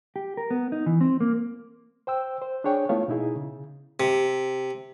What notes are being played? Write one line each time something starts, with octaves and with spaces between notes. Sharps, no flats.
G4
A#4
B3
D#4
E3
C4
A#3
C5 G5 E6
C5
D4 G#4 C#5 G5
A3 B3 E4 F4 C#5 F5
B2 D#4 E4 G#4
C#3
C3